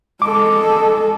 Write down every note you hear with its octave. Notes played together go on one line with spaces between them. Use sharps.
G#3 A4 D6